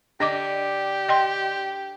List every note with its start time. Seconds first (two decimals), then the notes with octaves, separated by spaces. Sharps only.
0.20 D3 D4 G4 D#5 D6
1.09 D#5 G5 C6